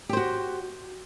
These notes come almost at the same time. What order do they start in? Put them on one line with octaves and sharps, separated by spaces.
G4 C5 F#4